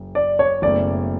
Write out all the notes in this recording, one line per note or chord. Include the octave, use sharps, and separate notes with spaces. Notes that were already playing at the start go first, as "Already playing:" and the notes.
Already playing: F#1
D5
C#5
F#1 B2 A3 C#4 D5